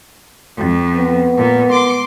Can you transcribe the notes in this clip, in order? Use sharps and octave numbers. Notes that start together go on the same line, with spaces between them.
F2
B3
A#2
C6 D6